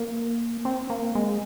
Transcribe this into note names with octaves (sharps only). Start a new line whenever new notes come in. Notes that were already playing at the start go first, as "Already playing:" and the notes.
Already playing: A#3
C4
A#3
G#3